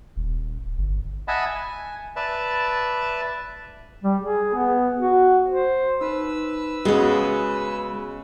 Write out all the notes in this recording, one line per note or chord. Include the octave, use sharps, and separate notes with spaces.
D#1
G1
D#5 E5 F#5 G#5 A5 B5
G#5
B4 D5 E5 A5
G3
G#4
B3
F#4
C5
D#4 B4 C5 E6
C#3 G#3 B3 F#4 D#5